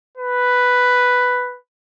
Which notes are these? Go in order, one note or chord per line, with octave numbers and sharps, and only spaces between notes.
B4